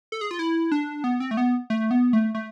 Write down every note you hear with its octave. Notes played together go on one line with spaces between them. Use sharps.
A4
G#4
F4
E4
D4
B3
C4
A3
B3
A3
B3
A3
A3